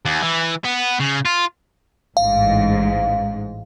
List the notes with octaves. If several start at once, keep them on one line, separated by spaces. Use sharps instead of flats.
D#2
E3
B3
C#3
F4
A1 G#2 F5